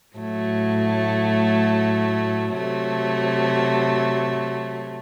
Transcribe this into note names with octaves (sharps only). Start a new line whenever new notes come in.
A2 F#3 A3
C3 F#3 A3